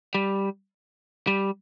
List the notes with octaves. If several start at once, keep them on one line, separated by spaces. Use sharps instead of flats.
G3
G3